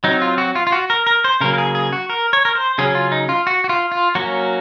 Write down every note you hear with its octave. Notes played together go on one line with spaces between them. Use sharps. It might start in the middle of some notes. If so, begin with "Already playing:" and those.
F#3 C4 D#4
F4
F#4
F4
F4
F#4
A#4
A#4
C5
C#3 F#3 A#3 A#4
A#4
G#4
G#4
F#4
A#4
C#5
A#4
C5
C#3 F#3 C#4 G#4
F4
D#4
F4
F#4
F#4
F4
F4
F#3 A#3 C#4 F#4